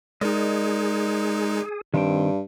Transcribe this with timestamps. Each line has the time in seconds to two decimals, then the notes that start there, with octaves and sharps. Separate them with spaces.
0.21 G#3 D#4 G#4 A#4 D5 D#5
1.94 G2 D#3 C4 G5